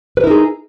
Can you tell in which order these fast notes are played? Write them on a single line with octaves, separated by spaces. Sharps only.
B4 A#4 E4 D#4 G#4